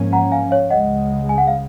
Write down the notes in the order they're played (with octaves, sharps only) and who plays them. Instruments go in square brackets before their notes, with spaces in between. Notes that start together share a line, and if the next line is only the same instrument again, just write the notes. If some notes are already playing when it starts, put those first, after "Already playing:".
Already playing: [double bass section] G#2 F3 A#3 C#4
[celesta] F#5 A#5
F5 G#5
C#5 F5
[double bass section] C#2 C#3 G#3 [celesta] D#5 F#5
[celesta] G#5
F#5
F5